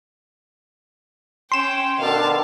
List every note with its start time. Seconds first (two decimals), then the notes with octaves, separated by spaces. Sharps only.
1.52 C#4 G5 C6 E7
1.99 B2 D3 D#3 F5 A5